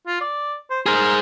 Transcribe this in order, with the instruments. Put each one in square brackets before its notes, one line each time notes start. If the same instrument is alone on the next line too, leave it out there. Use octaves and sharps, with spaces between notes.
[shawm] F4
D5
C5
[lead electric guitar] G#4 C5 [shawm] A#4